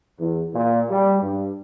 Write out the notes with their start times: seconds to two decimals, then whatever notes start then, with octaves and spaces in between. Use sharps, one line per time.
0.20 E2
0.55 A#2
0.90 G3
1.22 G2